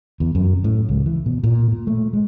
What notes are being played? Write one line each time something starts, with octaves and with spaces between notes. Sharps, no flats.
E2
F#2
C3
A2
C#2
E3
B2
A#2
A#2
A3
G#3